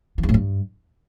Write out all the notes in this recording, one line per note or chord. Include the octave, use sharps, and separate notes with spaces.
E3
E2
A2
G2